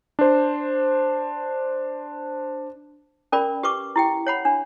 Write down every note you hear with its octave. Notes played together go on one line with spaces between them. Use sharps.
D4 C5
C#4 A#4 D5 B5
G4 B4 C#6 D6
E4 G4 G5
C#5 F#5 B5
D4